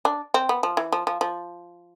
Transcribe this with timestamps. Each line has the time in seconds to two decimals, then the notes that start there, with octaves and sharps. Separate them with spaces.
0.05 D4
0.34 C4
0.49 B3
0.63 F3
0.77 E3
0.92 F3
1.07 F3
1.21 F3